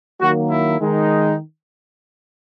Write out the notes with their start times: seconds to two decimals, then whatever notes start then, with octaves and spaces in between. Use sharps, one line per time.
0.21 D#3 F#3 A#3 F#4
0.50 E4
0.80 D#3 G#3 D#4